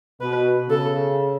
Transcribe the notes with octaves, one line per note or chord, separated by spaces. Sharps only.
B2 B4
C#3 A4